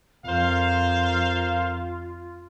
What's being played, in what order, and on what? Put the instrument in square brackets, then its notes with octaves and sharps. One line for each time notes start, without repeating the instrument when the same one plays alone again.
[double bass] F2 [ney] F4 [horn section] A#4 C5 F5